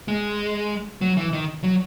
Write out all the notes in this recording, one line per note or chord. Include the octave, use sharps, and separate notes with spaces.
G#3
F#3
E3
D#3
F#3